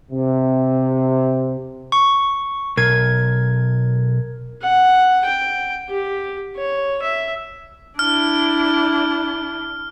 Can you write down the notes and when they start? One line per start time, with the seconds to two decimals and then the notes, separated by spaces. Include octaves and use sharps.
0.11 C3
1.92 C#6
2.77 B1 A#4 G#6
4.62 F#5
5.25 G5
5.89 G4
6.56 C#5
7.02 E5
7.99 D4 E4 F6